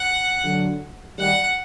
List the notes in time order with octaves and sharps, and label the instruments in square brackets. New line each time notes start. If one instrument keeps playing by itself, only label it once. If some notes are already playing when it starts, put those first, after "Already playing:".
Already playing: [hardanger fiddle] F#5
[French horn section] D3 F#3
[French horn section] D#3 G3 [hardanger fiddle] F#5